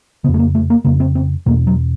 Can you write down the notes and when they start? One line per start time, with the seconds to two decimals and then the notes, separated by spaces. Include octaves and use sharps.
0.24 C#3 B3
0.28 F2
0.34 A3
0.39 A#3
0.55 A3
0.70 A#3
0.85 F2 C#3 A#3
1.00 C4
1.15 C4
1.46 E2 B2 A#3
1.67 F#3